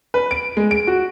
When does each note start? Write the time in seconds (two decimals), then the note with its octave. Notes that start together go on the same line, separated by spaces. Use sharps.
0.14 B4
0.31 D7
0.57 G#3
0.71 D7
0.87 F#4